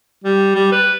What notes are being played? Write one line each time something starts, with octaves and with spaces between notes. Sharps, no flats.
G3
G3
B4